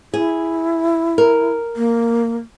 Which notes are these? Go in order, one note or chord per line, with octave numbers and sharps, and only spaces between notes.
E4 G#4
A#4
A#3